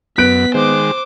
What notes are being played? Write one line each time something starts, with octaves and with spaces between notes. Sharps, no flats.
F#2 B3 F#6 B6 D7
D#3 G#3 C5 D6